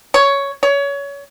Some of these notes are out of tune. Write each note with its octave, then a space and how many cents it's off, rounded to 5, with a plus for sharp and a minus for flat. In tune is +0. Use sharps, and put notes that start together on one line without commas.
C#5 +10
C#5 +25